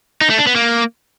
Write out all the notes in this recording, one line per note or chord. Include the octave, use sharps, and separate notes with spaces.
D#4
A3
D4
B3
A#3